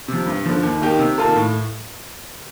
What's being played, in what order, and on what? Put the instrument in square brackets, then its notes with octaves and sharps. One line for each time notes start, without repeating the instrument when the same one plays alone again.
[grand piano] C3 F3
G2
D3 F3
D#2
D#3 A#3 D#4 G4
C3
D#3 A#3 F4 A4
A2